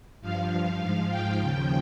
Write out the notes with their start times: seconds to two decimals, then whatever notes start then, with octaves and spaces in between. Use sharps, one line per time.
0.22 G2 F3 F5
0.80 G#2 F3 F5
1.10 G5
1.39 D#2 C#3 F3